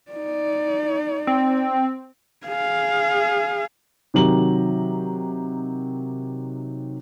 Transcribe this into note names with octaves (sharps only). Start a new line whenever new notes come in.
D#4 D5
C4
G#4 F5
C3 D#3 F#3 G4 A#5 F#7